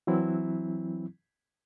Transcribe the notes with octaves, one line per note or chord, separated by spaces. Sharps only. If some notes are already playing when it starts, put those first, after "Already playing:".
E3 F#3 C4 E4